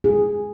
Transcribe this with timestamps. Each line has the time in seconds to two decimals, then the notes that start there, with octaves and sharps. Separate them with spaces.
0.04 G#4